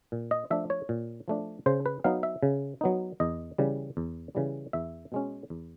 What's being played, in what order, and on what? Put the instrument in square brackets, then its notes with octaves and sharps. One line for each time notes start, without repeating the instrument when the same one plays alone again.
[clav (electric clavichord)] A#2
D#5
F3 A3 D4 E5
C#5
A#2
F3 A3 D4
C#3 C5
B4
F#3 B3 D#4 F5
E5
C#3
F#3 B3 D#4
E2 D#5
C#3 E3 G3
E2
C#3 E3 G3
E2 E5
B2 G#3 C#4
E2